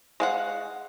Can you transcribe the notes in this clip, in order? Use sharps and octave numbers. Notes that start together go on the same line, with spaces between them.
G#3 F5 F#5